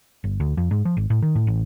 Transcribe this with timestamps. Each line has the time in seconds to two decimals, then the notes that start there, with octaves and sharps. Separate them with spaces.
0.24 G1
0.40 D2
0.57 F2
0.71 G#2
0.85 F3
0.97 G#1
1.10 A2
1.22 D#3
1.35 A2
1.47 A1